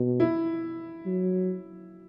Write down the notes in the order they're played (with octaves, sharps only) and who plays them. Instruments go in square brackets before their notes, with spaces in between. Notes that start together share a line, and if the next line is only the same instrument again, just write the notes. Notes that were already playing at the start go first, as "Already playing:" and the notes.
Already playing: [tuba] B2
[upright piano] E4
[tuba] F#3